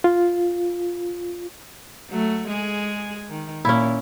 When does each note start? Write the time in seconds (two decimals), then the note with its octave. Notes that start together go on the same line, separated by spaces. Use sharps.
0.04 F4
2.10 F#3 A3
2.47 G#3 G#4
3.29 D#3
3.65 A#2 C#4 E4